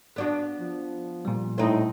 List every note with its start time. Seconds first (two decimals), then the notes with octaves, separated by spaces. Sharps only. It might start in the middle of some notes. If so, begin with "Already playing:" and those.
0.16 B3 D4 F#4
0.60 F3
1.25 A#2 G3
1.58 A2 C4 D#4